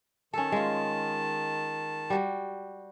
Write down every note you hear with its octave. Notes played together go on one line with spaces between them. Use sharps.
D#3 C#4 A4 A5
G#3 F4
G3 F#4